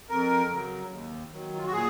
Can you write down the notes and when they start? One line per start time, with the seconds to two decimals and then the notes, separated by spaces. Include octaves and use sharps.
0.09 F2 A#4
0.50 C#3 F#3
0.91 D#2
1.32 D#3 F#3
1.58 F4
1.66 F#4
1.73 A#2 G#4